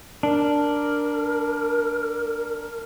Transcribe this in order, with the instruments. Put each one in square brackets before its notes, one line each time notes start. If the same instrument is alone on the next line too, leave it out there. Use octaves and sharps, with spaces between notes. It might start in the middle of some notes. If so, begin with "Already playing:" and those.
[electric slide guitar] D4 [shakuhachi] A#4